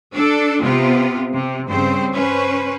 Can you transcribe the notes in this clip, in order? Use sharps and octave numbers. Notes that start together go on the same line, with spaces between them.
D4 A4
C3 B3 F4
C3
G2 C#3 C4 C5
C#4 B4 C5